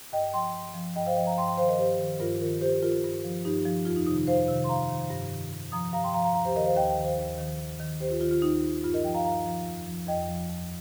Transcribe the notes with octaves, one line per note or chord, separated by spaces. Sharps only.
G2 D#5 G5
F3 G5 C6
G2
F3
G2 D#5 G5
C5 F5
F3 D#5 G5
F5 A#5
G2 G5 C6
G5 C6
D#3 C5 F5
A#4 D#5
G2 G4 C5
D#3
G2 F4 A#4
D#3 F4 A#4
G2 G4 C5
D#3 F4 A#4
G2
F3
G2 D#4 G4
F3
F2 F4
D#4
C3 D#3 D#4
D#4
F2 C5 F5
C3 D#3
C6
G2 F5 A#5
D#3
G2
D#3
G2
F3 A#5 D#6
G2 F5 A#5
G5 C6
F3 F5 A#5
F5 A#5
D#2 F5 A#5
G4 C5
D#3 A#4 D#5
C5 F5
D#2 D#5 G5
D#5 G5
D#3
C5 F5
D#2
D#3
D#2
D#3
D#2 G4 C5
F4
D#3 F4
F4
D#2 D#4
D#3
G2 F4
A#4 D#5
F3 D#5 G5
F5 A#5
G2 F5 A#5
F3
F2
F3
F2 D#5 G5
F3
F2